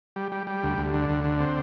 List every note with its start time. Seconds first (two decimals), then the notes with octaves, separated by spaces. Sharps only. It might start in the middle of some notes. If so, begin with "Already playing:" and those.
0.16 G3
0.32 G3
0.47 G3
0.63 D2
0.78 D2
0.94 D3
1.09 D2
1.24 D3
1.40 C4